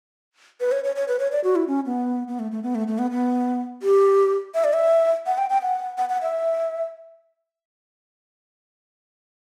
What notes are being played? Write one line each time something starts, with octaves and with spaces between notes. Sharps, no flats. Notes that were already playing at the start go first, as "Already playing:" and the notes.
B4
C#5
C#5
C#5
B4
C#5
D5
F#4
E4
C#4
B3
B3
A3
A3
B3
A3
A3
B3
B3
G4
E5
D5
E5
F#5
G5
G5
F#5
F#5
F#5
E5